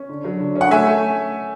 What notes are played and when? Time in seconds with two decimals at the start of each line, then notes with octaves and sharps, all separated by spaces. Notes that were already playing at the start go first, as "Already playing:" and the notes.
Already playing: C#4
0.09 D3
0.24 F#3
0.40 D3
0.55 C#4
0.61 F#5
0.71 A3 E5 G#5
0.87 A3